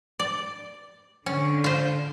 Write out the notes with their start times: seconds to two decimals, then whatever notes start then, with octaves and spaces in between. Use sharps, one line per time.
0.19 D5
1.26 D3 C#4
1.64 F4 C5